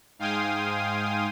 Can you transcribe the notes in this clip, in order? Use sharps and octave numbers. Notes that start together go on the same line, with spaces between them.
G#2 F5 G5 G#5 C6 D#6